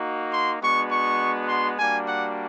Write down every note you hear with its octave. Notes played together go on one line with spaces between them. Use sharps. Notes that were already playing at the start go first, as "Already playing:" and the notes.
Already playing: A#3 D#4 F#4
C6
G#3 B3 D4 F#4 C#6
C#6
C6
G3 A#3 D4 F#4 G#5
F#5